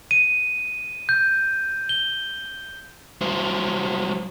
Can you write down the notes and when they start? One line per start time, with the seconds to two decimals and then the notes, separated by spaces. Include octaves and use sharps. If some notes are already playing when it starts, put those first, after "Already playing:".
0.11 D#7
1.09 G6
1.89 G7
3.21 F#3 G3 C5